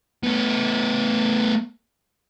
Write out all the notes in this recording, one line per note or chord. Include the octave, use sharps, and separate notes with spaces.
A3 B3